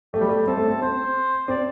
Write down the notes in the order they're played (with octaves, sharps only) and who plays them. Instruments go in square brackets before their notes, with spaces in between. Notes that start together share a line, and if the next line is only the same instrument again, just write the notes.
[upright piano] A3 [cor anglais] G4
[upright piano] G3
A3
[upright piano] C4 [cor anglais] A4
[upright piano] A3
C4
[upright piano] C4 [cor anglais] C5
[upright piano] C4 [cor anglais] D5